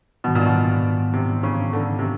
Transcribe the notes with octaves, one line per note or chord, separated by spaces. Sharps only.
G#2 B2 D#3 G3 B3
A#2
B2
C3
C#3
D3
C3